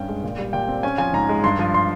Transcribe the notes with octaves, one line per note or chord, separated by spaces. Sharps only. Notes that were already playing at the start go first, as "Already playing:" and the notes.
Already playing: G2 C#4 G5
G#3
A#2
G3
A#2 G5
C4
C#4 G#5
F3 G#5
G#2 A#5
G#3
G2 C6
F3
C6